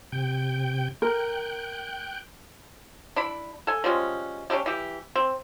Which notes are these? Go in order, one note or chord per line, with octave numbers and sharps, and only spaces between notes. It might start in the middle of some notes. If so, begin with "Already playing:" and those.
C3 G5 G6
A#4 G5 F#6 G6
D4 E4 B5
A4 G#5
F3 G3 G#3 C#4
C#4 D4 E4 G4
E3 G4
C4